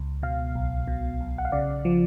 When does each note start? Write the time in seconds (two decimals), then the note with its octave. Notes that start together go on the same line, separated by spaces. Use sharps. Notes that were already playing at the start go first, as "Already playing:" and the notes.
Already playing: C#2
0.23 B2 F5
0.55 B1
0.88 B2
1.21 B1
1.38 F#5
1.45 F5
1.52 C#3 D5
1.85 F3